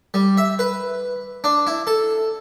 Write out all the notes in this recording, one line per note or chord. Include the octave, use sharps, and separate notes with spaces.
G3
E5
B4
D4
E4
A4